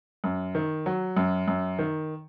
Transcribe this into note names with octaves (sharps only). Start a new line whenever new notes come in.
F#2
D#3
F#3
F#2
F#2
D#3